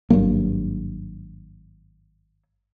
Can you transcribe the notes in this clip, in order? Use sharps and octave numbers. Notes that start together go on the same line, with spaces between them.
G#1 G2 F#3 A#3